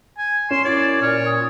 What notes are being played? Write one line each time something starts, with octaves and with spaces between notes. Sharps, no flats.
G#5
C#4 C6 E7
F#2 E4 D5 G#6
A#2 C#5 F6
D#6